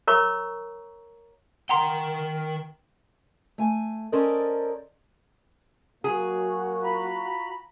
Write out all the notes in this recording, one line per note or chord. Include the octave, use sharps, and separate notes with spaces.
A#4 C#5 A#5 C#6
D#3 A#4 F#5 G5 A#5 C6
A3 G#5
C#4 A4 A#4 C5 D5 D#5
F#3 A#3 F#4 G#4
F4 A#5 B5